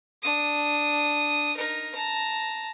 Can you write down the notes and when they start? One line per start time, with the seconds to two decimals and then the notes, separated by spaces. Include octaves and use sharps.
0.22 D4 D#6
1.56 D#4 A#4
1.95 A5 A#5